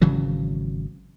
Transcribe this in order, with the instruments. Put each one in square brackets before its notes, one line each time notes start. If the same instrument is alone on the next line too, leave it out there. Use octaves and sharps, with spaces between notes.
[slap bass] G#1 C#3 E3 F#3